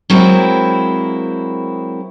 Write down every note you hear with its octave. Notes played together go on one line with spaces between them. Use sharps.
F#3 G#3 A#3 C4 E4